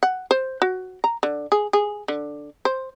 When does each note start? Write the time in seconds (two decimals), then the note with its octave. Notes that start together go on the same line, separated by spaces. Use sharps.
0.03 F#5
0.31 C5
0.62 F#4
1.04 A#5
1.23 D3
1.52 G#4
1.73 G#4
2.08 D3
2.65 C5